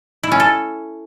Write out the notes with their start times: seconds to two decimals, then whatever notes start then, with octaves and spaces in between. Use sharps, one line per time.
0.23 E4
0.32 C#4
0.40 A4